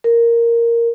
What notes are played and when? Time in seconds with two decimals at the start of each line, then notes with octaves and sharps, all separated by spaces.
0.04 A#4